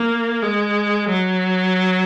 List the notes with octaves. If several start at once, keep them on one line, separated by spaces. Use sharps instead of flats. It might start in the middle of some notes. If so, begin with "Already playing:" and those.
Already playing: A#3
G#3
F#3